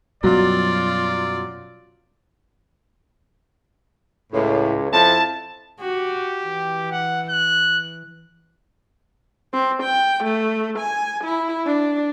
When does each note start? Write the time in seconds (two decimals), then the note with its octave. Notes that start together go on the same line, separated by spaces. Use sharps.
0.23 F#2 B2 F#3 G3 F4 D5
4.33 C#2 A2
4.92 F2 E4 A5
5.80 F#4 G4
6.45 E3
6.92 F#5
7.30 F#6
9.53 C4
9.83 G5
10.24 A3
10.79 G#5
11.24 E4
11.66 D4